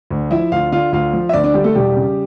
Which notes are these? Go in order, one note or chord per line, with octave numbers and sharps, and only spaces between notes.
D2
F3 E4 E5
D2 F4 F5
D3 F4 F5
D2 F4 F5
F3
E5
D2 D4 D5
D4 D5
D3 G3 G4
A3 A4
E1 G3 G4
C#3